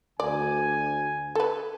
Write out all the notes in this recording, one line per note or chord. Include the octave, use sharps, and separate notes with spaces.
D2 D5 G#5
A4 B4